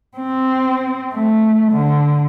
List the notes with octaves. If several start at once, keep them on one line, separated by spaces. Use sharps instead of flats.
C4
A3
D3